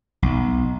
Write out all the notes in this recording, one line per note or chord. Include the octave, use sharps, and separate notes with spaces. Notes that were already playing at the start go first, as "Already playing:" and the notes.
B1